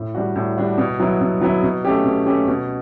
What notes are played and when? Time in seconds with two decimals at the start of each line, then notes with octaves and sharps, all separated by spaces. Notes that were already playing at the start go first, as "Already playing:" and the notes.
Already playing: A2
0.15 G3 D4 F#4
0.36 A2
0.58 G3 D4 F#4
0.78 B2
1.00 F#3 B3 E4
1.21 B2
1.41 F#3 B3 E4
1.63 B2
1.85 A3 C#4 G4
2.05 B2
2.26 A3 C#4 G4
2.47 B2